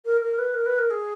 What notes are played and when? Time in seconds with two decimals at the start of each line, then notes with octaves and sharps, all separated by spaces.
0.05 A#4
0.21 A#4
0.38 B4
0.54 A#4
0.66 B4
0.78 A#4
0.90 G#4